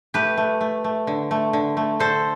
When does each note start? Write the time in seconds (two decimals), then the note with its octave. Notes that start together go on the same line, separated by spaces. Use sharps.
0.14 A3 G4 B4
0.37 A3
0.61 A3
0.84 A3
1.07 D3
1.31 A3
1.53 D3
1.77 A3
2.00 D3 A4 C5